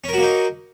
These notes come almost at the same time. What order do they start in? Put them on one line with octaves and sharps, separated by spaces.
C#4 A#4 F#4 A#3 D#4